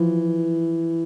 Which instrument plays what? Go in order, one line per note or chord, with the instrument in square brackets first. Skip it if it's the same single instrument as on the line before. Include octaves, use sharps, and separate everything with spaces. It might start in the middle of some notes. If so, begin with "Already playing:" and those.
Already playing: [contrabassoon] E3 [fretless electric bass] F3